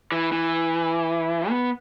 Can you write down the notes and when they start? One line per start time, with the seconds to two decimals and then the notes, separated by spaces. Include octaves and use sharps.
0.12 E3
0.32 E3
1.49 B3